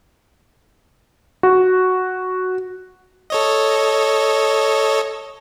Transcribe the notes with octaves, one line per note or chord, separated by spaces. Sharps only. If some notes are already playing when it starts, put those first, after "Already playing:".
F#4
A4 C#5 D#5